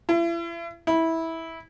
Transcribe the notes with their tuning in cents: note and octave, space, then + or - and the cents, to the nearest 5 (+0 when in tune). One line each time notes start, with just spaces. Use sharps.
E4 +40
E4 -15